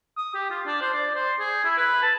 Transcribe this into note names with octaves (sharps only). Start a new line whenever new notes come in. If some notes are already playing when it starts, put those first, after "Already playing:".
D#6
G4
F4
D4
C5
D5
C5
G#4
E4
B4
A5